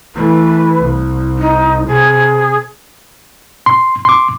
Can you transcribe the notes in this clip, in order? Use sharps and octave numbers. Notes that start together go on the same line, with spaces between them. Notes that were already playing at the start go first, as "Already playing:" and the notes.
E3 A3 B4
C2
D#4
C3 G#4
C6
C6 D6